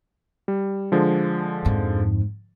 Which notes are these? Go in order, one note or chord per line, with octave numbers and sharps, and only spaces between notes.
G3
D3 F3 G#3
F2 G#2